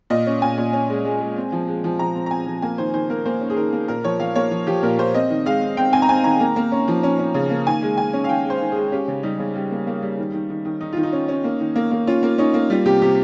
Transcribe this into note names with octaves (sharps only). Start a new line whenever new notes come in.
A#2 D#5
C#4
A#2 G#5
A#2
C#4
G#3
G#3
G#3
C4
F3
G#3
F3
F3 A#5
C4
A#5
C4 G#5
F3
A#3 G#5
D#3 C5
D#3 C5
A#3 A#4
A#3 C5
C#4
G#4
D#3 A#4
A#3
A#2 A#4
F3 C#5
F3 F5
A#3 C#5
F3
F3 G4
A#2 A#4
A#2 C5
C4 D#5
D#3
G#3 F5
C4
C4 G5
C4 G#5
A#5
C4 G#5
D#3 A#5
A#3
A#3
C#4
F3
C#4
C#4
C#3
A#3
D#3 G#5
G#3
D#3 G#5
C#4
F5
D#3 G5
G#3
C5
D#3
G#3 G#4
C#4 G4
C#3
G3 D#4
C#3
G3
A#3
A#3
G3
D#3
D#3
D#3
D#3
D#3 D#4
D#3 F4
D#4
C#4
C#4
A#3
D#3
A#3
A#3
C#4 F4
A#3
C#4 D#4
A#3
G3 F4
C3 G4
C3 G4